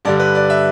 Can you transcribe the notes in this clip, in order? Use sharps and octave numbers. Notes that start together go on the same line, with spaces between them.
G2 D3 G3 D5
B4
D5
E5